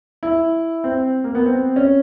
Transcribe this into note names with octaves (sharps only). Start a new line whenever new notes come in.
E4
C4
A#3
B3
C4
C#4